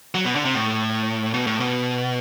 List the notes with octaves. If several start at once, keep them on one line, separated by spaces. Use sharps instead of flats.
F#3
B2
D3
C3
A2
B2
A2
B2